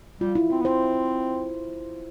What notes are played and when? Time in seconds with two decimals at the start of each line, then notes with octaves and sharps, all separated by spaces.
0.21 G3 F4
0.35 E4
0.50 C4 F4
0.61 B3
0.65 C4 C5